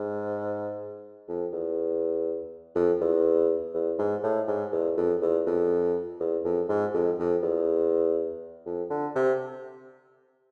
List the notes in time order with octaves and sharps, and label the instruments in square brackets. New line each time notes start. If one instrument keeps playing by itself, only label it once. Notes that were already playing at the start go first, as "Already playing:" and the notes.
Already playing: [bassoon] G#2
F2
E2
F2
E2
E2
G#2
A2
G#2
E2
F2
E2
F2
E2
F2
G#2
F2
F2
E2
F2
D3
C3